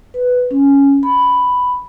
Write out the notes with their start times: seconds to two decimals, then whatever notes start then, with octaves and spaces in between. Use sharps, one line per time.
0.14 B4
0.51 C#4
1.03 B5